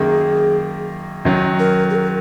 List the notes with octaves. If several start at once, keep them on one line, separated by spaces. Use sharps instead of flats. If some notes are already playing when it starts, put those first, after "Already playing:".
Already playing: F#2 D#3 A#3 G#4
F#2 D#3 F#3
A#4
G#4
A#4